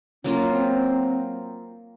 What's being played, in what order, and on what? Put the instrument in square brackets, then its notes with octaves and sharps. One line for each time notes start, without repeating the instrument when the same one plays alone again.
[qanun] F#3 A#3 F4 [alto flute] C#4
[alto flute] C4